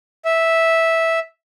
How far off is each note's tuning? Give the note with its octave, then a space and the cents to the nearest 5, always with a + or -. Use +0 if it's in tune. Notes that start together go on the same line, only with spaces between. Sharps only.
E5 -10